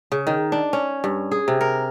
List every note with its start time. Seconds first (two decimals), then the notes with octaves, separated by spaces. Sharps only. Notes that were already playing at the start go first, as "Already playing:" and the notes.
0.12 C#3
0.27 D#3
0.52 D4
0.73 C#4
1.04 G2
1.32 G#4
1.48 C3
1.61 A#4